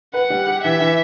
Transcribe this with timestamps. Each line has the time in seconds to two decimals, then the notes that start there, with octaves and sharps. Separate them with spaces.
0.14 B4 F#5
0.30 G3
0.47 G4
0.64 E3 E5
0.80 E3